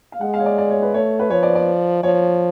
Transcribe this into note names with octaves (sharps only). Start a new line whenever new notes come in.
F5
G#3 F#5
F5
C#5
D5
D5
C#5
B4
A3 C#5
B4
F3 C#5
D5
D5
F3 C#5